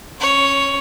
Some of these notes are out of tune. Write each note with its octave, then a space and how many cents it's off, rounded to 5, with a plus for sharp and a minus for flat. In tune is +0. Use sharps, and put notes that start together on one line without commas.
C#4 -20 C#5 +5